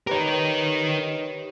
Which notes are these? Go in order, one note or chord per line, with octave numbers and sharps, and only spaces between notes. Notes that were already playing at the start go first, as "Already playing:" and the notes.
D#4 G4 A#4 B4 C#5